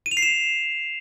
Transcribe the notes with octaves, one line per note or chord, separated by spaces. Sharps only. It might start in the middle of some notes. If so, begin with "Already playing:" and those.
D#7
F7
C7
E7